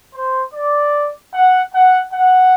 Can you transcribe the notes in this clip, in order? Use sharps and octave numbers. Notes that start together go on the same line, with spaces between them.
C5
D5
F#5
F#5
F#5